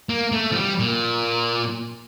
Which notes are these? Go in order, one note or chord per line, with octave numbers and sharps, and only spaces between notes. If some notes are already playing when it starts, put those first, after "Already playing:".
A#3
A3
F3
G3
A#2